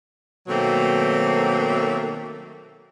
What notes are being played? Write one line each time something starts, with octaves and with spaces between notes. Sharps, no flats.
B2 D#3 F#3 A3 A#3 C4